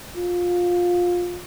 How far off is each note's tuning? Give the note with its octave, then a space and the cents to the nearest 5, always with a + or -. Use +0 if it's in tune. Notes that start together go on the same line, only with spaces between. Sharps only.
F4 +20